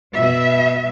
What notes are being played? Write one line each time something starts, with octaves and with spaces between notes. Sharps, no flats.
B2 E5